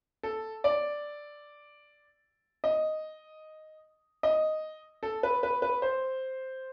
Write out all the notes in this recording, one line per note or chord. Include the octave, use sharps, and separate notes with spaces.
A4
D5
D#5
D#5
A4
B4
B4
B4
C5